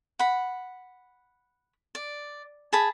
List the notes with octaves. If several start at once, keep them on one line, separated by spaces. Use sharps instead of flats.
F#5 B5
D5
G#4 A5 B5